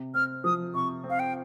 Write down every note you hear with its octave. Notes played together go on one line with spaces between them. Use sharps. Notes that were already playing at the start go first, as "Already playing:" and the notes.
Already playing: C3
C4 F6
F3 D#6
C3 C#6
C4
F5
G5